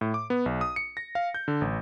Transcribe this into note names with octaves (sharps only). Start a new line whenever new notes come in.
A2
D6
B3
B1
D#6
C#7
A#6
F5
G6
D3
A1